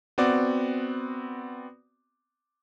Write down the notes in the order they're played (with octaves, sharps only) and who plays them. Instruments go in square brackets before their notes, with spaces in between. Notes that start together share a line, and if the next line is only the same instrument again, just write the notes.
[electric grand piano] B3 C4 F#4 D5